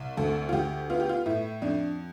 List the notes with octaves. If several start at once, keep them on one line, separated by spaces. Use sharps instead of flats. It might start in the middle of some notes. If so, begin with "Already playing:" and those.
Already playing: C2
D2 A4
F4
D2 G4
B3 F4
G4
F4
A2 E4
F2 D4